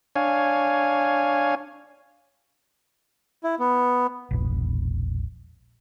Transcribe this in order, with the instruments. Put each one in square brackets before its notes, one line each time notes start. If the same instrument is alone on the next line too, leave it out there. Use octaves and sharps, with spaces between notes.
[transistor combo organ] D4 C#5 F5 G#5
[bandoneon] E4
B3
[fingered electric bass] E1 A#1